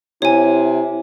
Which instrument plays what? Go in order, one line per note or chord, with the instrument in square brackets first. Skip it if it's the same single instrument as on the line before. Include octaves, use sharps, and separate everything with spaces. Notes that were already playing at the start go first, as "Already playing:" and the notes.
[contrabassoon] C3 [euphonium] E4 [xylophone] C#5 G#5